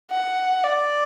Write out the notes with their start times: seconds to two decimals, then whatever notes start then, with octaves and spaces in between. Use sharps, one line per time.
0.11 F#5
0.63 D5